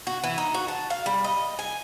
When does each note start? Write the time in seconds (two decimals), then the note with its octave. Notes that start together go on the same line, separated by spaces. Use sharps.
0.07 F#4
0.24 E3
0.38 D#4
0.55 F#4
0.68 A5
0.90 F5
1.06 G3
1.24 D#5
1.59 G#5